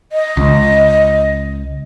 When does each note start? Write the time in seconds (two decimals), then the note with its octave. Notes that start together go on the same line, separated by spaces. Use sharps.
0.12 D#5
0.37 C#2